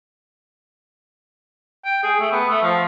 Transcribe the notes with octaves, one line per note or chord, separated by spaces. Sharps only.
G5
G#4
A3
B3
A3
F3